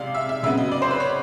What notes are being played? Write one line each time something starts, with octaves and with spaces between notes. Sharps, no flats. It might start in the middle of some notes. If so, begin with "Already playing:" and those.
Already playing: C3 G#3 D5 D#5 F5
E5
E5
C#3 F#3 B3 E5
D#5
D5
C5
B4
C#5